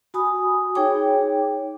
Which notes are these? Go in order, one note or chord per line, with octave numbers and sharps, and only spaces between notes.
F#4 G#5 B5 D#6
D#4 G#4 C#5 G5 D6